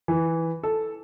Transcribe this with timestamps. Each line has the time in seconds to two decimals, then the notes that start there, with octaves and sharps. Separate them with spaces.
0.08 E3
0.63 A4